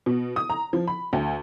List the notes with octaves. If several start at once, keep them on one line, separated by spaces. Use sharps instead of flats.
B2
D#6
A#5
F3
B5
D2